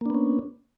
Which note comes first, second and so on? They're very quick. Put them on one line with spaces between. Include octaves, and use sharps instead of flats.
A#3 D4 B3 C#4